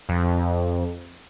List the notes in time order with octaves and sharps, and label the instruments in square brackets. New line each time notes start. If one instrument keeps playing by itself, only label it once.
[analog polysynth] F2